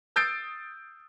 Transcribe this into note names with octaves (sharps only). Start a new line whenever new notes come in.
D#6 E6 G6 A6 C7 D7